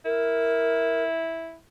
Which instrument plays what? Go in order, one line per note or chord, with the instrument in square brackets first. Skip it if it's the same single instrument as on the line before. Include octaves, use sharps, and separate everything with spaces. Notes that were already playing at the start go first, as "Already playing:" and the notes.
[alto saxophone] E4 [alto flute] A#4